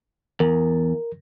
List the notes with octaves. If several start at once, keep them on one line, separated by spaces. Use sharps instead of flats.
E2 A#4